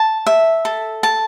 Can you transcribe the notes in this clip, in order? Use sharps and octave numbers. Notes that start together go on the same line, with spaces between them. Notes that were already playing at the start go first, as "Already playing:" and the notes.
Already playing: A5
E5
A4
A5